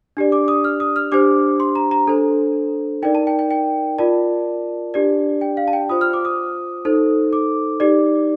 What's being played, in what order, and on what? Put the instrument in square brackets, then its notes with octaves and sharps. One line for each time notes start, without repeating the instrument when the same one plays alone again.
[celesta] D4 G4 D5
D6
D#6
F6
D#6
F6
D4 G4 C5 D6
C6
A#5
A#5
D4 A4 C5
D#4 A#4 D5 G5
A5
G5
G5
G5
F4 A#4 D5 A5
D4 G4 D5
G5
F5
A5
G5
F4 C5 D#6
F6
D6
D#6
D#4 A4 C5
D6
D#4 G4 D5